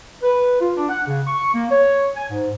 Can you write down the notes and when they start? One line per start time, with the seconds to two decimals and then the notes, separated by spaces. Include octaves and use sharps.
0.23 B4
0.60 F4
0.76 D4
0.89 F#5
1.07 C#3
1.27 C#6
1.54 A#3
1.70 C#5
2.16 G#5
2.30 G#2